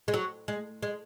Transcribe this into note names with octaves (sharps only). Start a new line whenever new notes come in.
G#3
F#3
G#3
G#3